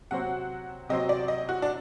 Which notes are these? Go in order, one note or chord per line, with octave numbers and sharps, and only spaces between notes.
C3 F#3 C4 F#4 C5 F#5
C3 F#3 C4 F#4 C5 D#5
D5
D#5
F#4
D4